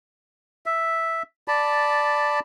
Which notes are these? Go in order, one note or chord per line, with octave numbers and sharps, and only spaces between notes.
E5
D5 A5 B5